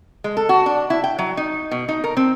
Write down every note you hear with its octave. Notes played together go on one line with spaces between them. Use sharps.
G#3
A4
F#4
D4
E4
G5
F#3
D#4
B2
D#4
A#4
C4